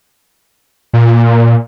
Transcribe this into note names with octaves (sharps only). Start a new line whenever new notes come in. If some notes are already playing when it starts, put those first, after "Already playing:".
A#2